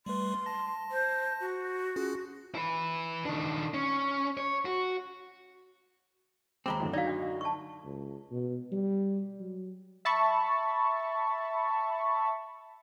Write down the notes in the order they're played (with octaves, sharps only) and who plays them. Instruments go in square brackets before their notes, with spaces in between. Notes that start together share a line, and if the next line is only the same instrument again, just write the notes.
[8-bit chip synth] G3 A3 B4 [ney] C6
[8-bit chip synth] A5 A#6
[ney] C5
F#4
[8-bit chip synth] C#4 F4 G#4
[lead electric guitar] E4 B4
D#3 D4
C#4
C#5
F#4
[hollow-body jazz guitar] D#2 G#3 C4 [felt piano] A#5 B5 D6
[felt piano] F#2 A2 D3
[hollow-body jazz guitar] D#4 [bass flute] F#4 [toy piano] D5 F5
[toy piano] D4 D#5
A5 C#6
[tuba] C#2
B2
G3
F#3
[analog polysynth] E5 A5 B5 C#6